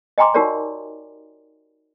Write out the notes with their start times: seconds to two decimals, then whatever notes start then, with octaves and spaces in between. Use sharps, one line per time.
0.18 D#5 G5 G#5 A#5 C6 D6
0.34 D#4 F#4 G4 A#4 C#5 D5